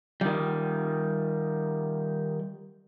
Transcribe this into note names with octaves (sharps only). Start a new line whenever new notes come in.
D#3 G3